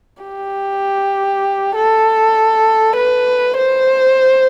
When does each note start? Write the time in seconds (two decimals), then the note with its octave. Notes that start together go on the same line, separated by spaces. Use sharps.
0.23 G4
1.75 A4
2.97 B4
3.58 C5